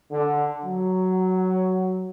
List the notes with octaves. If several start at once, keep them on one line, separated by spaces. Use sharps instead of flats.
D3
F#3